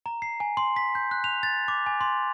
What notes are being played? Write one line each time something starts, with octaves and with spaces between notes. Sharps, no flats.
A#5
C7
G#5
C6
B6
G6
F#6
F7
A6
D6
G#5
C6